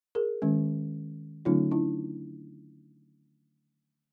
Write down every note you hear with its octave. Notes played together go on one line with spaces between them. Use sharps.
G#4 A#4
D#3 G#3 C#4
D3 F#3 A3 C#4 D#4 F4
D4 E4